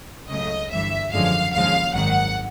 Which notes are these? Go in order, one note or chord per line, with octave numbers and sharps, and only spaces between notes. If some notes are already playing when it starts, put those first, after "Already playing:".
C#2 C#3 F#3 A3 D#5
G1 G2 E3 E5
G#1 F#2 D3 F3 G#3 F5
D#2 C#3 F3 G#3 F5
G#1 F#2 D#3 F#5